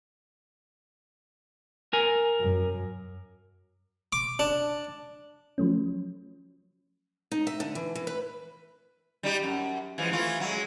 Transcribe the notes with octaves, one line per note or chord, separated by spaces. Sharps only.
A#4 G#5
F#2
D6
D4
F3 F#3 A3 C#4
D#4
E5
D3
E3
E3
B4
G3 D#4 G4
F#2
E3 F3 G#3
E3 A3 F4
F#3 G#3